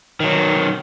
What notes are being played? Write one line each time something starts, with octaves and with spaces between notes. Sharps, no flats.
D#3 F#3